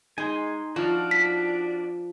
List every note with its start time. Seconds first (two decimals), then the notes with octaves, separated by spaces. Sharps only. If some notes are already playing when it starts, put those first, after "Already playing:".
0.18 G#3 D#4 G#5 C6
0.76 F3 D4 F#4 D5 F5
1.11 B6